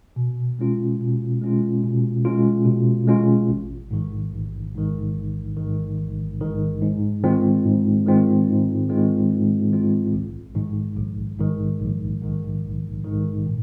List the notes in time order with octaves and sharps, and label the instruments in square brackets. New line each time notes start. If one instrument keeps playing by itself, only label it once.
[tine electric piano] B2
G#3 C#4 F4
B2
G#3 C#4 F4
B2
G#3 C#4 F4
B2
G#3 C#4 F4
A1
G#2 D#3
A1
G#2 D#3
A1
G#2 D#3
A1
G#2 D#3
G#2
D#3 G#3 C4 F4
G#2
D#3 G#3 C4 F4
G#2
D#3 G#3 C4 F4
G#2
D#3 G#3 C4 F4
A#1
G#2 D#3
A#1
G#2 D#3
A#1
G#2 D#3
A#1
G#2 D#3
A#2